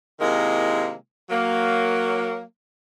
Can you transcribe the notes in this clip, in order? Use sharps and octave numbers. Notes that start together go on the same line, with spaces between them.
C3 D#3 G#3 A#3 E4
F#3 A#3